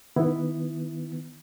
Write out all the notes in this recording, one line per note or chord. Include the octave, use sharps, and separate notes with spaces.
D#3 B3 E4